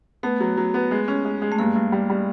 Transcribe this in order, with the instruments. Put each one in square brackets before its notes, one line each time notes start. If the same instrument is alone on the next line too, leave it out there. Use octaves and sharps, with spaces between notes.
[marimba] A3 [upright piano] B3
[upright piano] F#3
F#3
B3
G#3
C#4
G#3
G#3
[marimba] A3
[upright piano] G2 [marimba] A#3
[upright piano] G2
G3
G3